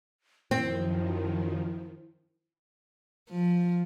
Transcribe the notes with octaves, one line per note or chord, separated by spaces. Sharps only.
F#2 D#3 F3 C4 E4
F3